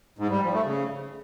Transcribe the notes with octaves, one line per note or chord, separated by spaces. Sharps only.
G#2
G3
F3
A3
C#3